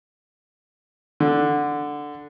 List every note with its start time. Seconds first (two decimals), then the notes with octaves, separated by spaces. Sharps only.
1.20 D3